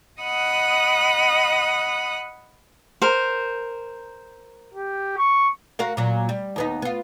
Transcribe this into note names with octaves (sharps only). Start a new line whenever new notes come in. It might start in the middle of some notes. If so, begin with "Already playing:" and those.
D#5 F#5 B5 D#6 F#6
A#4 C5
G4
C#6
F#4 A#4 F5
A#2 F#3
G3
D#2 B3 D#4
B3 F4